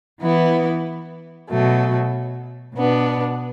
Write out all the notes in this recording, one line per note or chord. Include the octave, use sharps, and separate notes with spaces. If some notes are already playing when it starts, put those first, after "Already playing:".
E3 B3 E4
B2 F#3 A3
B2 B3 D4